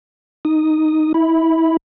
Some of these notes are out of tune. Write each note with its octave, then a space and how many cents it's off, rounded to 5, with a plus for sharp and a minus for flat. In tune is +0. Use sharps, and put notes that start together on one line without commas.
D#4 +0 D#6 +0
E4 -30 E5 -20 B5 +0